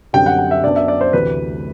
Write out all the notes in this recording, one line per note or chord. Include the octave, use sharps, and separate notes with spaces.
F#2 D3 G3 C4 G5
F#5
G5
E5
F#2 F#3 B3 D4 D5
E5
D5
C5
D2 C3 E3 B4